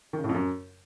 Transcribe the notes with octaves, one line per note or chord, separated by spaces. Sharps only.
D#3
C#3
A2
F2
F#2